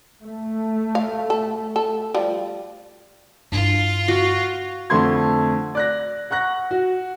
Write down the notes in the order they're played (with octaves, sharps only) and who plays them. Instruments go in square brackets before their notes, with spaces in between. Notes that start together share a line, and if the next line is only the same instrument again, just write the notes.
[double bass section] A3
[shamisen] F5
A4
A4
F3 G3
[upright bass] G2 E4 [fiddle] F4
[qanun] F#4
[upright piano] F2 D3 A3 C6 G#6
D5 F#6 A#6
F#5 C#6 F#6 A#6
F#4